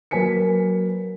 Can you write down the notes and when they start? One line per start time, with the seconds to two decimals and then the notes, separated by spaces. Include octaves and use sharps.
0.11 F#3 A#3 B4 G#5 B6 C#7